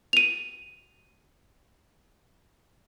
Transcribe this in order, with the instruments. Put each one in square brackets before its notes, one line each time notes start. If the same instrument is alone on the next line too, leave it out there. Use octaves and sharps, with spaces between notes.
[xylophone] D#7 F7